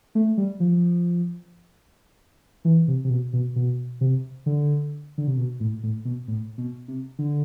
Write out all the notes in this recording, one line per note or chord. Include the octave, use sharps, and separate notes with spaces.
A3
G3
F3
E3
C3
C3
B2
B2
B2
C3
D3
D3
C3
B2
A2
A2
B2
A2
B2
C3
D3